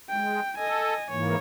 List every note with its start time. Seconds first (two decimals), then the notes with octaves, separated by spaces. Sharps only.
0.10 G#3 G5
0.58 A4 D#5 G#5
1.10 G#2 E3 A#3 C#5